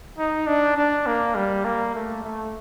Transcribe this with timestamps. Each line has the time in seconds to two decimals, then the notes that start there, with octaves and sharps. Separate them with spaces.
0.18 D#4
0.47 D4
0.77 D4
1.06 A#3
1.35 G3
1.65 A#3
1.95 A3
2.24 A3